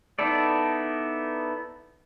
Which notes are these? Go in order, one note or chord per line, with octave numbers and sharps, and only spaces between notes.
B3 D#4 E4 A4 D5